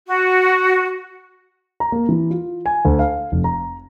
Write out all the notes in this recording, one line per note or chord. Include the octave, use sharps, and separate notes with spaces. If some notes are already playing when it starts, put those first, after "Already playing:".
F#4
A#5
A#3
E3
F4
G#5
D2
F5
F1
A#5